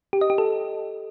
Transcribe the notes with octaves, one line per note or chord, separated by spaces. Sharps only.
G4
D#5
G4
A4